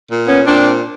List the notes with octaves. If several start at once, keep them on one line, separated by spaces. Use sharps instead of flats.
A#2
B3 C#4
A#2 C4 D4